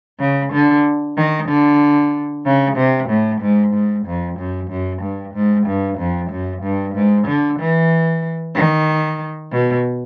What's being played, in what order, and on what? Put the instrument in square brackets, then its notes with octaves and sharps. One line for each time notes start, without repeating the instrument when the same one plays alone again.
[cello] C#3
D3
D#3
D3
C#3
C3
A2
G#2
G#2
F2
F#2
F#2
G2
G#2
G2
F2
F#2
G2
G#2
D3
E3
D#3
B2